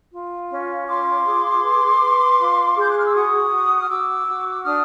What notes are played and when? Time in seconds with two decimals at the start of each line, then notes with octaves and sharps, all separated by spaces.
0.12 F4
0.50 C#4
0.87 F4 C6 D6
1.24 G#4
1.63 B4
2.00 B4
2.37 F4
2.75 G#4 G6
2.88 F#6
2.96 F6
3.05 E6
3.13 F#4 C#6 D#6
3.50 F#4
3.81 F6
3.88 F#4 D6 E6
4.26 F#4
4.63 D4 D#6 F6